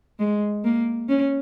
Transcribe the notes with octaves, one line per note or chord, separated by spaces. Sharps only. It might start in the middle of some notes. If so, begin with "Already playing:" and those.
G#3
A#3
C#4